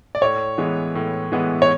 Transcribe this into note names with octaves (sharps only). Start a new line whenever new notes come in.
D5
A2 C#5
E3 G#3 B3
A2
E3 G#3 B3
C#5